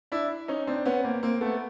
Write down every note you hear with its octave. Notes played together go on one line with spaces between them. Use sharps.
D4 E4
C#4 D#4
C4 D4
B3 C#4
A#3 C4
A#3 C4
A3 B3